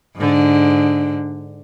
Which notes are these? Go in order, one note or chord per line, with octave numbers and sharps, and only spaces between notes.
G#2 D3